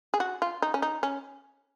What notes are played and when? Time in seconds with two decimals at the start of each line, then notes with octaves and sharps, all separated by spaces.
0.14 G#4
0.20 F#4
0.42 F4
0.62 D#4
0.74 C#4
0.82 D#4
1.03 C#4